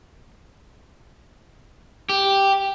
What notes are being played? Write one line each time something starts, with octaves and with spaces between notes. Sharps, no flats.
G4